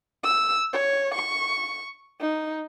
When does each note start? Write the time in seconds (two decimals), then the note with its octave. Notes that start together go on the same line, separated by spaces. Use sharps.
0.24 E6
0.73 C#5
1.15 C#6
2.21 D#4